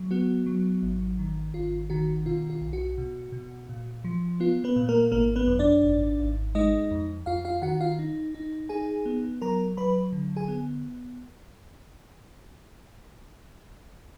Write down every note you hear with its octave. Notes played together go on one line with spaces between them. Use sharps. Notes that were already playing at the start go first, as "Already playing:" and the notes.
Already playing: F#3
B3 F#4
F#3
G#1
D#3
G#1 F4
D#3 F#4
B2 F4
F4
B1
F#4
B2
B2
A#2
F3
B3 F4
B3 B4
A#2
A#3 A#4
G#1 A#3 A#4
B3 B4
F#2
D4 D5
G#1
G#1
G#3 D#4 D#5
F2
F2 F4 F5
F4 F5
D#3 F#4 F#5
F4 F5
D#4
D#4
D#4 G#4 G#5
B3
F#3 A#4 A#5
F#3 B4 B5
D3
G#4 G#5
B3